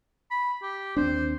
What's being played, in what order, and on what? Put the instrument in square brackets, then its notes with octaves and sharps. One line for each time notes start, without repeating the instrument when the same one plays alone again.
[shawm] B5
G4
[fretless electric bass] D#2 C4 D4 [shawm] C5